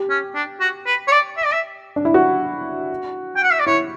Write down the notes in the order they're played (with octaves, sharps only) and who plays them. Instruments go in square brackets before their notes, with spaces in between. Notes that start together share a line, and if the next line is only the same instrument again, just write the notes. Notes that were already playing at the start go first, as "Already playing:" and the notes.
Already playing: [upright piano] G4
[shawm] C#4
D4
F#4
B4
C#5
D5
E5
D5
E5
[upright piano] D4
E4
F#4
[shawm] G5
F#5
E5
D5
[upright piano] E4 [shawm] C#5